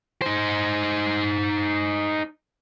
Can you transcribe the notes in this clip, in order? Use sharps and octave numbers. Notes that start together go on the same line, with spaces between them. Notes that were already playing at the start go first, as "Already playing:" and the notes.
D#4 C5